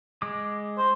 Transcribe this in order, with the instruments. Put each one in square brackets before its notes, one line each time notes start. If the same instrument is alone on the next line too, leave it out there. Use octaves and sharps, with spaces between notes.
[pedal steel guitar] G#3 D6
[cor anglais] C5